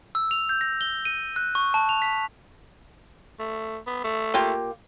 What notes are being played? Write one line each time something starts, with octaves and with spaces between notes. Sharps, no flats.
E6
F7
G6
A#6
G7
D#7
F#6
C#6
A5
F7
B6
A3
B3
A3
A#3 F4 G4